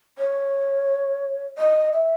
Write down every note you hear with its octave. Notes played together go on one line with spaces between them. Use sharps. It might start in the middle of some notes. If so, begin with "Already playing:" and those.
C#5
D#5
E5